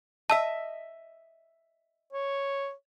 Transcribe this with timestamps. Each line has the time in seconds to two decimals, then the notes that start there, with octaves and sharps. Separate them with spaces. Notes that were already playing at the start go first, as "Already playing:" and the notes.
0.30 D#5 E5 A5 E6
2.12 C#5